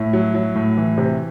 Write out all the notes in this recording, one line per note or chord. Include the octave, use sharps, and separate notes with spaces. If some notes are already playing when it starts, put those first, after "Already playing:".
Already playing: A2 E4
F#3
F#3
A2
E3
C3